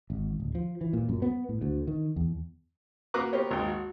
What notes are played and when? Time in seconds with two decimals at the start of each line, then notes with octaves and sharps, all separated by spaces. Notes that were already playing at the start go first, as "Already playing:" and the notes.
0.10 G#1
0.40 D1
0.55 F3
0.81 E3
0.93 A#2
1.09 F#2
1.22 B3
1.49 A2
1.61 D2
1.88 D#3
2.16 E2
3.14 A#3 F#4 B4 A#5 D6 F#6
3.33 B3 G4 A#4 C5 C#5
3.51 G#1 D#2 G5
3.68 F#4